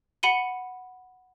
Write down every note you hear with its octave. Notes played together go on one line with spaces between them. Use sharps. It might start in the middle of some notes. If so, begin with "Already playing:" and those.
F#5 B5 C#7 D#7 G7